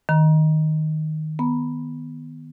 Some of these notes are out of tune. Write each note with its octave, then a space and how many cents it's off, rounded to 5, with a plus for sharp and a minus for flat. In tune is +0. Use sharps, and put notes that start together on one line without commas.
D#3 +0 A#5 +25
B3 +0 A#5 +0